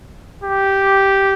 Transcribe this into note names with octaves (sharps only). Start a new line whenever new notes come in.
G4